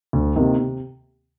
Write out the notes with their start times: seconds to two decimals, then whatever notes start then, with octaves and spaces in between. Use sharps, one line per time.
0.13 D2
0.36 C3 D#3 A#3
0.58 C3